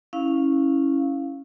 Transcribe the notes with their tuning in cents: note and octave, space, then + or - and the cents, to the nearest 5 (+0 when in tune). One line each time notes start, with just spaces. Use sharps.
C#4 -5 E4 -15 F5 +0